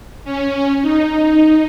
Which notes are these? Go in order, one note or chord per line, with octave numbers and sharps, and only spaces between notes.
C#4
D#4